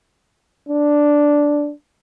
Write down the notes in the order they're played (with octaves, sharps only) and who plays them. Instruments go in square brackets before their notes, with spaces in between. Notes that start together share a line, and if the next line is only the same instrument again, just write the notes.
[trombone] D4